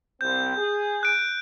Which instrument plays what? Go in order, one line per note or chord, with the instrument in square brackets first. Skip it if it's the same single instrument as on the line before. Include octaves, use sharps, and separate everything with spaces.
[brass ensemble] C2 C4 [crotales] G6
[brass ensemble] G#4
[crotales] F#6 D7